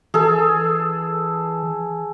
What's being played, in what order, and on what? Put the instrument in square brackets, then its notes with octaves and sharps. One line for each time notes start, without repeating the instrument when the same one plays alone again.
[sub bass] E3 [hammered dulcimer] G#4 A4